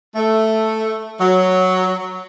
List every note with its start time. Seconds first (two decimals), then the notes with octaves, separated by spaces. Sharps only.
0.15 A3
1.20 F#3